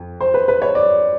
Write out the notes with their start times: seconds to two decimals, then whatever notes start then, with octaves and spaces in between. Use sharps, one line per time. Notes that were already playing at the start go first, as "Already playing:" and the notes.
Already playing: F2
0.21 C5
0.34 B4
0.48 B4
0.62 C#5
0.75 D5